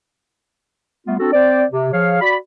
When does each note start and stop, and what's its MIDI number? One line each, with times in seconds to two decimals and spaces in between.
1.07 1.15 55
1.07 1.15 57
1.07 1.15 59
1.07 1.15 65
1.19 1.30 60
1.19 1.30 62
1.19 1.30 66
1.19 1.30 69
1.33 1.65 60
1.33 1.65 72
1.33 1.65 74
1.71 1.88 48
1.93 2.18 53
1.93 2.18 68
1.93 2.18 73
1.93 2.18 77
2.21 2.36 66
2.21 2.36 74
2.21 2.36 83